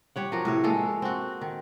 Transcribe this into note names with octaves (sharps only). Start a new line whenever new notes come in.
G3 C#5 F#5
F3 F#3 F#4 A#4
A2 C3 C#5
G#3 A#3 A4
C4 F#4
D#3